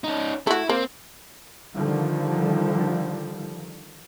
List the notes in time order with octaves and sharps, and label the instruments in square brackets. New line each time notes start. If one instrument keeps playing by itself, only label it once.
[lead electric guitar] C#4 D#4
[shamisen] A3 F#4 [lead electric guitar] E4
[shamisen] A#3 [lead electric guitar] C4
[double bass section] D3 D#3 F3 G3